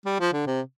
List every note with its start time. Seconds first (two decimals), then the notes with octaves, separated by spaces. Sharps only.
0.06 G3
0.20 F3
0.33 D3
0.47 C3